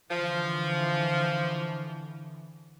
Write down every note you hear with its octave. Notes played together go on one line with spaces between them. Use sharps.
D3 E3 F3